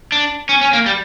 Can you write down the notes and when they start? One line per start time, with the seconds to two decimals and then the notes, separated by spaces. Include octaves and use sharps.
0.12 D4
0.49 C#4
0.61 C#4
0.73 A#3
0.86 G3